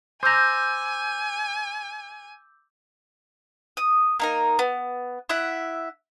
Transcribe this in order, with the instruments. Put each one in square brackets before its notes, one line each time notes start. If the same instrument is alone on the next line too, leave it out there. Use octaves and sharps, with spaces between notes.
[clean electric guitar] C5 A#5 [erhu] G#5 [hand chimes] D6 E6 G6
[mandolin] D#6
A#3 D#4 A#4
B3
E4 E5 F#5